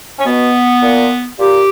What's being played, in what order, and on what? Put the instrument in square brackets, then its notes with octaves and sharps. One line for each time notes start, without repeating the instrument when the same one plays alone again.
[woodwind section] C#4
B2 B3
A#2
A#2 G4